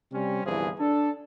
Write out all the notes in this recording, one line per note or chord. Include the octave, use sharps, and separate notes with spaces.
C3 G3 C4 C#4
G1 C2 E3 F3 G#4
D4 A4